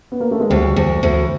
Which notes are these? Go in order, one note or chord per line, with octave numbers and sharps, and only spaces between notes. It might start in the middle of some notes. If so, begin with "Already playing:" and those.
B3
A#3
A3
G#3
D2 G3
D2
D2